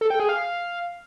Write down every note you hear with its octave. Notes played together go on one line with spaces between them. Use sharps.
A4
G5
G#4
F5